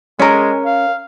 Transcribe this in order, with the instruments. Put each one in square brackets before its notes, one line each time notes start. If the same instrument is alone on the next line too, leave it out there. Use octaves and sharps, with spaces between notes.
[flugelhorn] G#3 [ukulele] C#4 A#4
[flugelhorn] F5